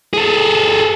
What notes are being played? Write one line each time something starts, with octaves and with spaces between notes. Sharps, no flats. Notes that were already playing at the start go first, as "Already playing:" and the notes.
G#4 A4